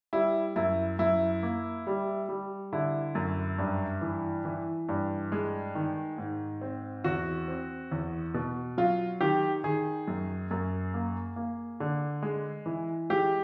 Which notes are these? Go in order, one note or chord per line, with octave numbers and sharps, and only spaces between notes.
G3 E4
F#2 E4
F#2 E4
A#3
G3
G3
D3 E4
F#2
G2
E3
E3
G2
G#3
D#3
G#2
C4
E2 F#4
C4
E2
B2
F#3 F4
D#3 G4
D#3 G#4
F#2
F#2
A#3
A#3
D3
G#3
E3
G#3 G4